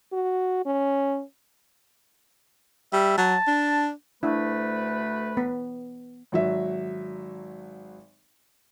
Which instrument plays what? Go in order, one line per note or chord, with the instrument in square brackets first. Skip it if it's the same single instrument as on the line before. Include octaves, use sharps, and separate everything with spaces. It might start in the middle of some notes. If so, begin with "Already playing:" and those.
[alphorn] F#4
C#4
[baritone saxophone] G3 [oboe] E5
[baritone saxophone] F#3 [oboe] A5
[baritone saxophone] D4
[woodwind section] D2 A3 B4 [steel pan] D4 E4
[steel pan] B3
[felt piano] G#1 F#3 E5